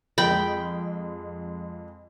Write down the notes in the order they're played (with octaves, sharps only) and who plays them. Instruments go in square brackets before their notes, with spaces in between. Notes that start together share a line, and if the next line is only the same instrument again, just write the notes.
[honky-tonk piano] F2 G#3 [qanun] G5 B5